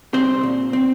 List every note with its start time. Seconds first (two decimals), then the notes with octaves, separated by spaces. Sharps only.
0.14 C2 C4 C5
0.43 A#2
0.73 C4